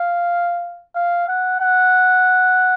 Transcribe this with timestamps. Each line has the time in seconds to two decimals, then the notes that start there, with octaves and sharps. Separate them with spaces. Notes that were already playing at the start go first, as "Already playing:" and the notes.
Already playing: F5
0.95 F5
1.28 F#5
1.61 F#5